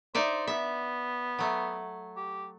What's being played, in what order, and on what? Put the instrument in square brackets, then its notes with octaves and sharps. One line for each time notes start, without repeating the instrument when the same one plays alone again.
[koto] D#4 D5 E5 [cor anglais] C5
[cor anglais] B3 [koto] E5
[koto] F#3 A3
[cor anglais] G4